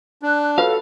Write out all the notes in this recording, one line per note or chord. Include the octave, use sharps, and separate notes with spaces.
D4 F#6
F4 F#4 A4 B4 C#5 F5